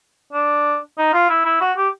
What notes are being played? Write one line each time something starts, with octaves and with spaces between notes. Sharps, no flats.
D4
D#4
F4
E4
E4
F#4
G4